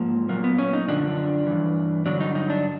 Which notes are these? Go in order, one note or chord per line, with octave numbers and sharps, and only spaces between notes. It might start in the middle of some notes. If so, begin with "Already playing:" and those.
Already playing: G#2 F3 A#3
A#2 F#3 A#3
B3
C#4
D#4
F#2 D3 F3 D4
G2 E3
G2 D3 F#3 D4
D#4
D#4
D4